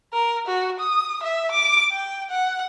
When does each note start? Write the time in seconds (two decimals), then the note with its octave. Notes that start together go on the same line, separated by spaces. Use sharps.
0.13 A#4
0.47 F#4
0.80 D#6
1.23 E5
1.51 D6
1.92 G5
2.30 F#5